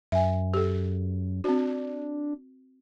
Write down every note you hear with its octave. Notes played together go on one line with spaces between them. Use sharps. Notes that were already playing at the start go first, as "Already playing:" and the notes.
F#2 E5 G#5
G4 A4
C4 D4 F#4